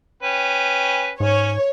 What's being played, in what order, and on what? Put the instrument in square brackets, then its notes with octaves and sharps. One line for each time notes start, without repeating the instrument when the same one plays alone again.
[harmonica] C#4 B4 G5
[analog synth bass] G#2 [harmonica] C#4 [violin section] C#5